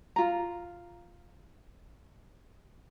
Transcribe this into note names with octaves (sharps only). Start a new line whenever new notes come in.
F4 A#5